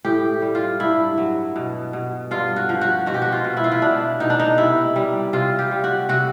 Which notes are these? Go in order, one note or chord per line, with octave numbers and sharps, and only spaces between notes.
A2 G4
G3
F4
G2 E4
F#3
B2
B2
G2 F4
F#4
F3
F#4
B2 F#4
G4
F#4
F4
B2
E4
F4
E4
B2 D4
B2 D#4
D4
D#4
C3 E4
G3
C3 F4
G4
G3
F#4
C3 F#4